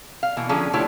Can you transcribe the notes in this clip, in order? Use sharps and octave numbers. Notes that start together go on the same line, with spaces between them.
F5
B2 E3 A#3
D3 F3 A#3 C#4 G4 G#4
D3 A3 E4 F4 G4 C#5